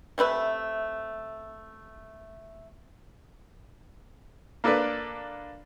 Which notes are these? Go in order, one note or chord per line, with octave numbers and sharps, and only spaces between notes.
C3 A3 B4 E5
A#3 D4 A4 B4 D5